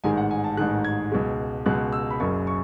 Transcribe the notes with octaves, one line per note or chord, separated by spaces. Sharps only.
A1 G#2 D#3 G#3 G#5
F#5
G#5
A5
A1 G#2 D#3 G#3 F#6
G#6
C#2 B2 G#3
C#2 B2 G#3 F#6
E6
B5
F#1 F#2 C#3 C#6
C#6